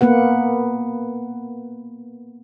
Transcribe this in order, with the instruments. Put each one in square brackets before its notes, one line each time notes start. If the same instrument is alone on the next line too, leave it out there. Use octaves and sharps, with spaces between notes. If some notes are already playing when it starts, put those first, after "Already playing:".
[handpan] A#3 B3 B4 F#5